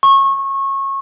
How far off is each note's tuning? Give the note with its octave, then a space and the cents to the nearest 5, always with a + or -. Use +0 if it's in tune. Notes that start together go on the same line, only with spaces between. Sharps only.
C#6 -25